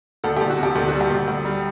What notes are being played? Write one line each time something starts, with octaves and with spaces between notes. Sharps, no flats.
D2 A4
D2 G4
F#4
C3 G4
D2 G4
F#4
G3
G4
D2
D2
G3